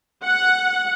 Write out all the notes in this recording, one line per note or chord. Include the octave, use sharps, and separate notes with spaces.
F#5